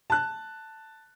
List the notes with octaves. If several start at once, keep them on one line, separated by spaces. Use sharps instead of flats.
A5 F#6